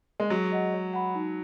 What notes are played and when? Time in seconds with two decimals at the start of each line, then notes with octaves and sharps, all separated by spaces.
0.20 G#3
0.30 F#3 G#4
0.52 D#5 F#5
0.73 C#5
0.93 F#5 B5
1.15 D#4